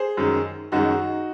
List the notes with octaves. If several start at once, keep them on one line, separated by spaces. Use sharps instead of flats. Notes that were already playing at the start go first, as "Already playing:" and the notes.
Already playing: G#4 C5
F#2 D#3 G#3
F#2 D#3 G#3 D#4 F#4